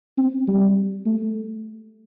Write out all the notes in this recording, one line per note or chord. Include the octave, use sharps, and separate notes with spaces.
C4
G3
A3